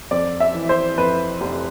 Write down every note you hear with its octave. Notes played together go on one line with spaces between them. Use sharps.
F2 D5
E5
E3
C5
F2 B4
F1